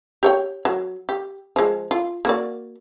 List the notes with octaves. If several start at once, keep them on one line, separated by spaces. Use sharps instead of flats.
G4 C#5 G5
F#3
G4
F3 G#3
F4
A#3 F#4 D5